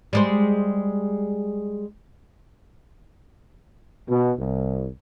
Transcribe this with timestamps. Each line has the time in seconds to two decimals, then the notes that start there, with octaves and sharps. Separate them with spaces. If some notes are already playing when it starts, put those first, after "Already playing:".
0.13 G3 G#3 C5
4.09 B2
4.39 C2